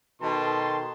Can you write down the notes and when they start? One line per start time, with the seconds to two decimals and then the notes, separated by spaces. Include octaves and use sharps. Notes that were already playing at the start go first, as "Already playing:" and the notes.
0.21 B2 D#3 A4 A5 C6